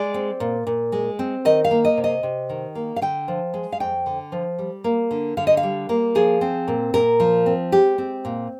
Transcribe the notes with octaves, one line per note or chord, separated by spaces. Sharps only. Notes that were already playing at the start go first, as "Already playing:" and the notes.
Already playing: G#3 D5
C4
A#2
A#2
G#3
C4
D#3 D#5
F5
A#3
D#5
C3
D#5
C3
D#3
A#3
F5
D3 G5
F3
G#3
F5
F2 G5
D3
F3
G3
A#3
D3
D3 F5
D#5
F5
G3
A#3
F3 G#4
C4
A#2
A#2 A#4
F3
C4
G#3 G4
C4
A#2